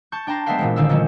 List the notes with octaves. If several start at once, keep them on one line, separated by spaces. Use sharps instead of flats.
A5 C#6 G6
D4 G5 A5 A#5 C6
G#3 B3 C5 E5 F5 G5
A#2 E3 G#3
A1 D3 D#3 C4 F5 E6
A#2 D#3 F3 G#3 C4 C#4